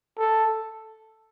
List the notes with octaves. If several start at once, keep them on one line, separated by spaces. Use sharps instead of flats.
A4